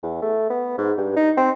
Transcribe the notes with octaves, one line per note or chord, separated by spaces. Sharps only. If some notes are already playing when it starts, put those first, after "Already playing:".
E2
A3
B3
G#2
G2
D#4
C4